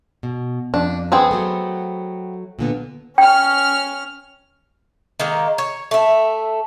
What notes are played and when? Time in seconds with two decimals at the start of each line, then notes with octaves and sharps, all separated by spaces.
0.23 B2
0.74 F2 D4
1.12 B3 C4 G#4
1.31 F#3 A3
2.59 A#2 D3 B3
3.18 C#4 G5 F6
5.20 D#3 G#3 A#3
5.58 C#5
5.91 A3 E5